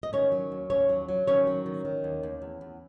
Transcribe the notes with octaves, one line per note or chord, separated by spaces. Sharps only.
D#5
D#3 C#4 C#5
F#3
D#2
D#2 C#4 C#5
F#3
F#3
D#3 C#4 C#5
F#3
D#3
D#3
D#2
D#2
E2
E2